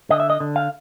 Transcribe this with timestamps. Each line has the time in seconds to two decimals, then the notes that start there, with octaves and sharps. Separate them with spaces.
0.10 D3 D#5
0.20 E5
0.30 D#5
0.40 D3
0.56 F5